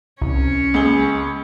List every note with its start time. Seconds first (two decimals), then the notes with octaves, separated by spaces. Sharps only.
0.22 C2 C#4 C#5
0.74 C#2 G#4 G7